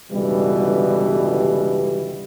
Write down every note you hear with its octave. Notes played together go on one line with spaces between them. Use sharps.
G1 C#2 B2 D3 E3 G3